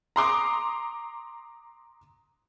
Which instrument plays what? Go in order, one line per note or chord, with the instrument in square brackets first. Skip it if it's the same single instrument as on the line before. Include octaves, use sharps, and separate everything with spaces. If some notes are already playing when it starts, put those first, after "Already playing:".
[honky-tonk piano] A#5 C6 D6 D#6